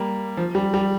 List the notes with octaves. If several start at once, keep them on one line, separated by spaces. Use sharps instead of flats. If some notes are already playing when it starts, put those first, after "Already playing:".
Already playing: G3 A#3
F3
G3
G3